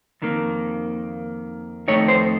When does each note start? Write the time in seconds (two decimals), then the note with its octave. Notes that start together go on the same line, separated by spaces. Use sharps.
0.22 F2 D#3 A#3
1.88 F2 D#3 A3 D#4 C#5
2.08 C5